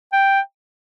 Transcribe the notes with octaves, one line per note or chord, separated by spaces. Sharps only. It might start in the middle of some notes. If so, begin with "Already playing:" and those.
G5